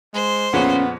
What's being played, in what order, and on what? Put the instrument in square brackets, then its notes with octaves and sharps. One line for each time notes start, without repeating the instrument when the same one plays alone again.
[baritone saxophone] G#3 [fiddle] C5
[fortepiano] F2 A#2 C#3 [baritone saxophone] B3 [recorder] C#4